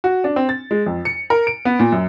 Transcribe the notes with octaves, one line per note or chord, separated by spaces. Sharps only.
F#4
D4
C4
A6
G#3
F2
C#7
A#4
D7
B3
A#2
F#2